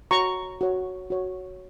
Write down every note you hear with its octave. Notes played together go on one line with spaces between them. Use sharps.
F#4 C#5 A#5 C#6
F#4 C#5
F#4 C#5